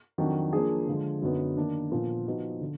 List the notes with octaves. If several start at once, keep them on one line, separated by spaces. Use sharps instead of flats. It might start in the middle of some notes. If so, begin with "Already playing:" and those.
F2 D#3 F#3 D4 F#4
F3 A#3 D4 G#4
D3 F3 G#3
F#2 D3 F#3 B3 D#4
D#3 A#3 D4
A#2 F3 B3
F3 B3 D#4 F#4
D3